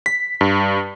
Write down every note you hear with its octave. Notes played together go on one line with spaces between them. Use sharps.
B6
G2